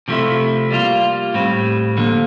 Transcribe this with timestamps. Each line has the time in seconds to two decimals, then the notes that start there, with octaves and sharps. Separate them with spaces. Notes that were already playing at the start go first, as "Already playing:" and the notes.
0.08 C3 F3 A3 E4
0.70 G3 A#3 F4
1.34 A2 G3 C4
1.97 D3 F3 A#3